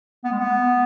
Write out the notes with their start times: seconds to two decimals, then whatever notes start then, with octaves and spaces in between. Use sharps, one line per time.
0.25 B3
0.32 G#3
0.40 B3